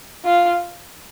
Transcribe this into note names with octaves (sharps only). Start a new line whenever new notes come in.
F4